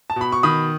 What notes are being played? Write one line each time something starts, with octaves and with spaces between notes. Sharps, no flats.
A5
B2 B5
C#6
D#3 B5 D#6